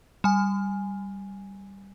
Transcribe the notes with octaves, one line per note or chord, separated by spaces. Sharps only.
G3 G#5